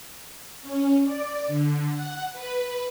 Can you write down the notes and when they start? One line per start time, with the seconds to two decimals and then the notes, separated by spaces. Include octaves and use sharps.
0.63 C#4
1.04 D5
1.48 D3
1.91 F#5
2.33 B4